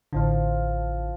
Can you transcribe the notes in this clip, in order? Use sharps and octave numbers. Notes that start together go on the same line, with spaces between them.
A1 D3 F3 F4